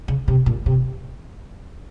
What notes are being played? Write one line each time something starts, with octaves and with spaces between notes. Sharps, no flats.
C#3
C3
A#2
C3